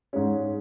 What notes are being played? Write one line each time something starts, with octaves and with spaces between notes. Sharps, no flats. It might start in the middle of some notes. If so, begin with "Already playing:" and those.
G#2 G#3 C#4